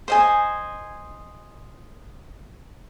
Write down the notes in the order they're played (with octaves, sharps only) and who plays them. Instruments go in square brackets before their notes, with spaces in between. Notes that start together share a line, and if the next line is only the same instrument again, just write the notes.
[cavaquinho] C5 D#5 G#5